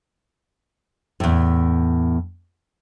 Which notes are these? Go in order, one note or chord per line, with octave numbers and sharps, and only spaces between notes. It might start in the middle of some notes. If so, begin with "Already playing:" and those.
E2 A2